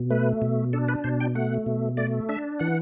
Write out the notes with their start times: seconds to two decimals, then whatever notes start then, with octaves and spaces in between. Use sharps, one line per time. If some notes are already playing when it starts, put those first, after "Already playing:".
Already playing: B2
0.10 A3 B4
0.42 B2
0.73 D4 A4
0.89 B4
1.04 B2 C5
1.20 G5
1.35 A3 F#5
1.66 B2
1.97 A3 D5
2.29 D4 E5
2.59 E3 F#5